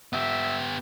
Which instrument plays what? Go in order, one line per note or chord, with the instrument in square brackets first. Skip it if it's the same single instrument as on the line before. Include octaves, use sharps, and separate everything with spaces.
[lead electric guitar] B3 G4 [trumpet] E5